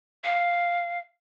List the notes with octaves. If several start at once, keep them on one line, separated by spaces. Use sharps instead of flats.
F5